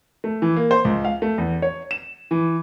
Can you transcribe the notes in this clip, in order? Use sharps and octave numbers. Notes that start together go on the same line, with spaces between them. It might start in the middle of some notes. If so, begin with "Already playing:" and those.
A3
E3
A#3
C5
C#2
F5
A3
E2
C#5
E7
E3